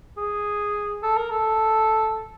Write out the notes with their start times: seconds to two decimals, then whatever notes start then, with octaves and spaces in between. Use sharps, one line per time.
0.17 G#4
1.03 A4
1.17 A#4
1.31 A4